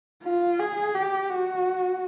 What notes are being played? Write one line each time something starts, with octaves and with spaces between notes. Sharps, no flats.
F4
G#4
G4
F#4